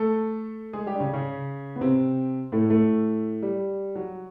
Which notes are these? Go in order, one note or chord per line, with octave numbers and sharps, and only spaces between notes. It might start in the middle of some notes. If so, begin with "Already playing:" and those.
Already playing: A3 A4
G#3 G#4
G3 G4
D4
C#3 C#4
C#3 C#4
B3
C3 C4
A2 A3
A2 A3
G3
F#3